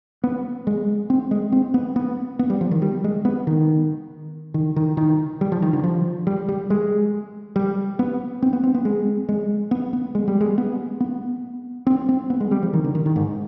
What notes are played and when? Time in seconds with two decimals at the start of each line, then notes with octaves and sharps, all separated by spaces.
0.24 B3
0.67 G#3
1.10 C4
1.31 G#3
1.52 C4
1.74 B3
1.96 B3
2.39 B3
2.50 G3
2.61 F3
2.71 D#3
2.82 G3
3.04 G#3
3.25 B3
3.47 D#3
4.54 D#3
4.76 D#3
4.97 D#3
5.41 G3
5.52 F3
5.62 D#3
5.73 D3
5.84 F3
6.27 G3
6.49 G3
6.70 G#3
7.56 G3
7.99 B3
8.42 C4
8.53 B3
8.64 C4
8.75 B3
8.85 G#3
9.29 G#3
9.71 B3
9.93 B3
10.15 G#3
10.28 G3
10.41 G#3
10.58 B3
11.00 B3
11.87 C4
12.09 C4
12.30 B3
12.41 G#3
12.51 G3
12.63 F3
12.73 D#3
12.84 D3
12.95 D#3
13.06 D#3
13.16 G#2